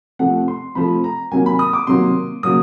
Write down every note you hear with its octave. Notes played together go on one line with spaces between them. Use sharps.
C3 F3 A3 F#5
C6
C3 F3 A3 B5
A#5
C3 D#3 F#3 A#3 G#5
B5
D#6
D6
C3 D#3 F#3 A#3 C6
C#3 F#3 A#3 D#6